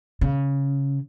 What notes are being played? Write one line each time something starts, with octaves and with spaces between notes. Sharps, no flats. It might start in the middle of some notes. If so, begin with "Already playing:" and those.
C#3